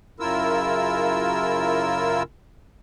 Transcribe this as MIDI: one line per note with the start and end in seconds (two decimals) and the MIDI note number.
0.20 2.23 42
0.20 2.23 49
0.20 2.23 64
0.20 2.23 65
0.20 2.23 70
0.20 2.23 88